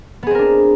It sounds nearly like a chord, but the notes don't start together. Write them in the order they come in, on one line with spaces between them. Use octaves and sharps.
B3 G#4 C4 A#4 D4